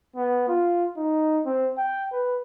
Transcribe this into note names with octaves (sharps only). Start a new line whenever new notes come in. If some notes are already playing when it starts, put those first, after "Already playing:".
B3
F4
D#4
C4
G5
B4